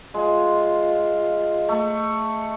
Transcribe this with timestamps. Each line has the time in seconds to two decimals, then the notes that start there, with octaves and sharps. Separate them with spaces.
0.14 G#3 F4
1.69 A3